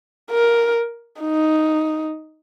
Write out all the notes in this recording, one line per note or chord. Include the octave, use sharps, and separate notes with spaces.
A#4
D#4